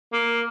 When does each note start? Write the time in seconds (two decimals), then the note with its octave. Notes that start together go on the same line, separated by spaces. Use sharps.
0.13 A#3